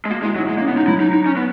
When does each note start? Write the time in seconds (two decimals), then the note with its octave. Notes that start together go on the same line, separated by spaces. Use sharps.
0.05 G#3
0.10 A#3 F#4
0.23 G#3 E4
0.35 F#3 D#4
0.49 G#3 E4
0.58 A#3
0.61 C#4
0.68 B3
0.77 D#4
0.88 F#3 E4
1.00 D#4
1.13 D#4
1.26 C#4
1.37 B3